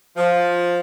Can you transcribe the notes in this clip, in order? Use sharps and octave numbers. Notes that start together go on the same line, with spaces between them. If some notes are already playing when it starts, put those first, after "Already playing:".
F3